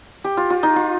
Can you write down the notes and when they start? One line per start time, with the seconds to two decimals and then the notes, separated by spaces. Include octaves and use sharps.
0.24 G4
0.37 F4
0.50 F4
0.63 D#4
0.76 F4